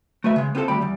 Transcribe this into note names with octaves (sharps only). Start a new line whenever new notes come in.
A3 F#4 B4 E5
C#3 G#3
B3 C4 F4 F#4 A4 C5
D2 G3 G5 B5
E2 G3